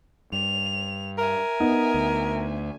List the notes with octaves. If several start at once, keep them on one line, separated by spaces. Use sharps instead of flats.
G2 F7
A#4 E5 G#5
B3 D#4
D2